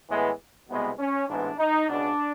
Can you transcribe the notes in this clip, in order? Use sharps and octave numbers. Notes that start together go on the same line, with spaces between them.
A2 E3 G#3 B3
C2 B2 G#3 B3
C#4
A1 G#2 E3 G#3 B3 D4
D#4
C#2 B2 G#3 D4